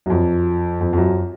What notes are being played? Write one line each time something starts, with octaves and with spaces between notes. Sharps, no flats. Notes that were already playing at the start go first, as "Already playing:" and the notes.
F#2
F2
F2
F2
F#2